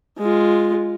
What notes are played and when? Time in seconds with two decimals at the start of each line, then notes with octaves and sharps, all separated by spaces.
0.17 G#3 F4